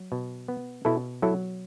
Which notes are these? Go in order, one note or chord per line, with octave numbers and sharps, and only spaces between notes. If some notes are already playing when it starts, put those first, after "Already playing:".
Already playing: F#3
B2
B3
B2 E4 A4
F#3 E4 A4